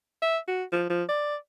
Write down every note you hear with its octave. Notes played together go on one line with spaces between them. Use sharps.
E5
F#4
F3
F3
D5